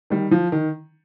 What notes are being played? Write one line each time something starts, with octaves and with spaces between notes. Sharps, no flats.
D#3 G3
F3
D#3